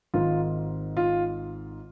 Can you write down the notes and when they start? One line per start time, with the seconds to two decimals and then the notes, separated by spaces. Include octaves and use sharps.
0.14 G#1 G#2 D#3 F4
0.97 F4